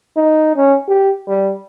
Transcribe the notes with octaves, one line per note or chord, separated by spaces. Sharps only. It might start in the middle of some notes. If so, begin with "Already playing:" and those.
D#4
C#4
G4
G3